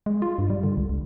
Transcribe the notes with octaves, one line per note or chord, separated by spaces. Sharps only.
G#3
F4
G2
G3
D3
C#2
C#2